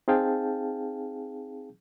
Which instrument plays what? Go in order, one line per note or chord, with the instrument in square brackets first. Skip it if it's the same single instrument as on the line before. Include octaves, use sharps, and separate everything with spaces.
[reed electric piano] C4 D#4 G#4 F5 G5 A5